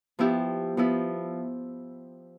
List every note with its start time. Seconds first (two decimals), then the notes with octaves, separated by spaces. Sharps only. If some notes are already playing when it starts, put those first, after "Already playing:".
0.19 F3 B3 E4 G4
0.77 F3 B3 E4